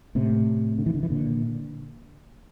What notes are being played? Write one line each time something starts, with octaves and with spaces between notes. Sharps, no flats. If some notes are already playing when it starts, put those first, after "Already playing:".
A2 C3
D3
E3
D3
E3
A#2 D3